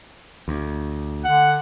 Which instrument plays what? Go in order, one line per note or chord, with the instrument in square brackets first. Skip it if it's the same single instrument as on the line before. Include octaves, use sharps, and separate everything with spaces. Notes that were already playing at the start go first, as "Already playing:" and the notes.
[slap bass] D2
[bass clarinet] D3 [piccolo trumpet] F#5